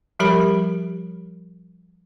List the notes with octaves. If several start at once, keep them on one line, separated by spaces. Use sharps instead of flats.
F3 G3 G4 A#4 B5